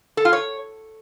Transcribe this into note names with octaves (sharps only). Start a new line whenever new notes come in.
A4
F4
C#5